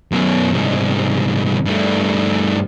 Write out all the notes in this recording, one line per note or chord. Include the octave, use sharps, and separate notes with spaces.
F#2 B2
C2 G#2
G2 A3